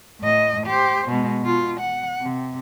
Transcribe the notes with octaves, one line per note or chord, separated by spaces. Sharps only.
A2 D#5
G4 C5
B2 G#3
B2 F4
F#5
C3